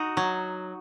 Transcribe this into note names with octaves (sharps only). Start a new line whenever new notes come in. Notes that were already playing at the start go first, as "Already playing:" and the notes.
Already playing: D#4 F#4
F#3